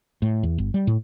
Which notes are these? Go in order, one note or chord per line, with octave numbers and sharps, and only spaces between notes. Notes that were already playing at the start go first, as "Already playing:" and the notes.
A2
E2
G1
G3
A2